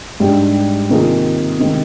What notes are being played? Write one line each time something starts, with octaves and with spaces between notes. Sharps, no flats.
G#2 G3 D4 G4
C3 D#3 A#3 F4 G#4
C3 D#3 G#3